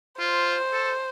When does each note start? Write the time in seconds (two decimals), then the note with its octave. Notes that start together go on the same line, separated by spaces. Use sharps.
0.19 F4 C5
0.72 A4